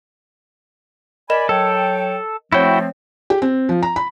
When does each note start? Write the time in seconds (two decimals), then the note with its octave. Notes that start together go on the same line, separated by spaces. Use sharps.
1.30 A#4 D5 D#5 G#5 B5 E7
1.49 F#3 A4 C#5 G5
2.52 F3 A3 C4 E4 F#4 C#5 G5 G#6
3.30 G4
3.42 C4
3.69 F3
3.83 A#5
3.96 B5